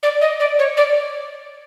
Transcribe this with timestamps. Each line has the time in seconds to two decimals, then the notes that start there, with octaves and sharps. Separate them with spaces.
0.03 D5
0.21 D#5
0.40 D5
0.59 C#5
0.77 D5